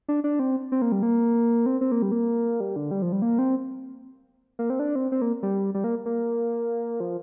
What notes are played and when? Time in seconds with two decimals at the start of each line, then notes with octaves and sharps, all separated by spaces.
0.08 D4
0.24 D4
0.39 C4
0.72 C4
0.82 A#3
0.92 G3
1.03 A#3
1.66 C4
1.81 C4
1.92 A#3
2.02 G3
2.12 A#3
2.60 G3
2.76 D3
2.91 G3
3.02 F3
3.12 G3
3.22 A#3
3.39 C4
4.59 A#3
4.70 C4
4.79 D4
4.96 C4
5.12 C4
5.21 A#3
5.43 G3
5.74 G3
5.84 A#3
6.06 A#3
7.00 F3